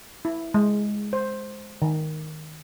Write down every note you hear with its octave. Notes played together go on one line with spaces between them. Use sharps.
E4
G#3
C5
D#3